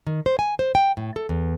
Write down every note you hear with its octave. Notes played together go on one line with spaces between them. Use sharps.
D#3
C5
G#5
C5
G5
A2
A4
E2